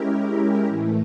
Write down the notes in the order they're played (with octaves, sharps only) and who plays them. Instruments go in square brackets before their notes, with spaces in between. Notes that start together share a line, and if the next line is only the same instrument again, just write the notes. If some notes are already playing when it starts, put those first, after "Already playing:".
Already playing: [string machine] G#3 C#4 E4 G4 A#4
A2 E3 A3